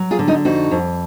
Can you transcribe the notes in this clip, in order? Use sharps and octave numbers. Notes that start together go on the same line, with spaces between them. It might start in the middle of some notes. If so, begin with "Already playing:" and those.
Already playing: F#3
F4 G#4
D3
D#4 F#4
F2 D#4 F#4
F2